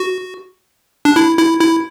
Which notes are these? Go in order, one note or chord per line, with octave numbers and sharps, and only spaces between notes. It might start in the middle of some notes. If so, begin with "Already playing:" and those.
Already playing: F#4
D4
E4
E4
E4